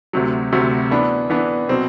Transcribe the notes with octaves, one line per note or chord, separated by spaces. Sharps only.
D2 C3 F#3
D2 C3 F#3
E3 B3 D4
E3 B3 D4
B2 F#3 C4